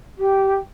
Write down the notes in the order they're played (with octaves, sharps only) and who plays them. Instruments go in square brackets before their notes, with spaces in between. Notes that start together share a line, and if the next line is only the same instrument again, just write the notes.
[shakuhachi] G4